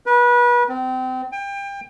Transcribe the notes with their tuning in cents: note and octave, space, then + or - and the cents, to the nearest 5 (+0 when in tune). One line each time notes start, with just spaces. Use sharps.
B4 -30
C4 -30
G5 +30